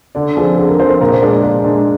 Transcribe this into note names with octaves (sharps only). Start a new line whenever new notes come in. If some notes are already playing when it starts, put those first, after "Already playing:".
D3 D5
F3 C4 G#4
D3 G#4
A#4
F3 C4 C5
C5
A#2 A#4
C5
G#3 D4 G#4 D5
D5
A#2 D5
G#3 D4 G#4